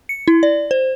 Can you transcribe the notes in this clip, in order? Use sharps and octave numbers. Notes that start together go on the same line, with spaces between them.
C#7
E4
D5
C5